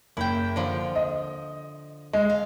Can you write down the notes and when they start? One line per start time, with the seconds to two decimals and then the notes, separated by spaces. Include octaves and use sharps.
0.17 F#1 E4 G5
0.56 D3 F3
0.96 D#5
2.13 G#3
2.30 F5